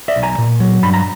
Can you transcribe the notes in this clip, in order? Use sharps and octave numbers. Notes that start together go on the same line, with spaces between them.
D5 E5
B1
G#5 A#5
A#2
F#3
G2 B5
A#5